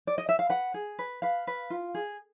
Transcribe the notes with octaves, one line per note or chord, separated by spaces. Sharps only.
D5
D#5
E5
F5
B4 F#5
G#4
B4
B4 F5
B4
F4
G#4